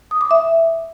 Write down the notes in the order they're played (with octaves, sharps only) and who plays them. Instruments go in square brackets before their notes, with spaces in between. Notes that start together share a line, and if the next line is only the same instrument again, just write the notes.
[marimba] D#6
D6
E5